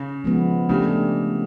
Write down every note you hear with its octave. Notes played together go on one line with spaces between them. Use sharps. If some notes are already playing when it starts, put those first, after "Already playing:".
Already playing: C#3
F3 G#3 B3
C#3 A3 D4 G4